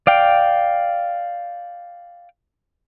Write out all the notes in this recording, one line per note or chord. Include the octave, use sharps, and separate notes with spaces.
D5 F5 G5